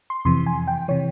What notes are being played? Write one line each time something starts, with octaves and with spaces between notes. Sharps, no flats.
C6
F2 C3 E3 C6
G#5
G5
C3 E3 C#5